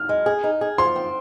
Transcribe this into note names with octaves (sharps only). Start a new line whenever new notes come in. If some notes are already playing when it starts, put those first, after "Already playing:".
Already playing: F6
G#3
G#4
D#4
G#4
F3 C6
C4